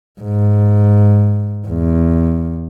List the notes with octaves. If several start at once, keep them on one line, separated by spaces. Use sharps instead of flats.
G#2
E2